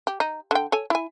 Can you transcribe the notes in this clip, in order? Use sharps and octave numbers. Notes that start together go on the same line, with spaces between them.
G4
D#4
D3 G5
A4 C#5 G#5
E4 G#5